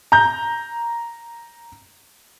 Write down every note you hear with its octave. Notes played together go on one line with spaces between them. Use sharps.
A#5 G6